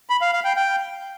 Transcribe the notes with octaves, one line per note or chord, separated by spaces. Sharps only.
B5
F5
F5
G5
G5